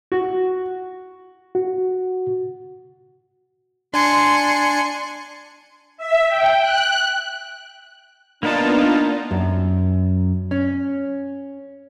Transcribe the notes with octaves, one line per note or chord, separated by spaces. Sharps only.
F#4
F#4
D4 G#5 C6 C#7
E5
G5
F#6
A#3 B3 D4 D#4 F4 A#4 D5 A5
F#2
C#4